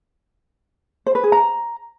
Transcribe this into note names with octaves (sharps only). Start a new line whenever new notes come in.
C5
B4
G#4
A#5